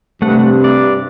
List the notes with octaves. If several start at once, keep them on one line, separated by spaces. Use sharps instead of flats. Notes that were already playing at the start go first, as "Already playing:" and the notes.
G2 C3 A3 F#5
D5